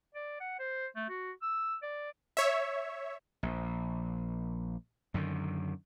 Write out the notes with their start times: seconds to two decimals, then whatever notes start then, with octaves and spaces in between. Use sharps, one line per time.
0.15 D5
0.40 F#5
0.59 C5
0.96 A3
1.09 F#4
1.42 E6
1.82 D5
2.37 C#5 E5
3.43 A#1
5.14 F#2 D3 D#3